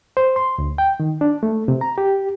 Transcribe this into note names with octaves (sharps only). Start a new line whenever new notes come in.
C5
C6
D2
G5
D#3
D4
A3
C3
A#5
G4